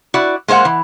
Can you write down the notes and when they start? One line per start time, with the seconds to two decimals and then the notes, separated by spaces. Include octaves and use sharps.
0.14 E4 F#4 D5
0.48 G#3 A#3 C5 E5 F#5
0.65 E3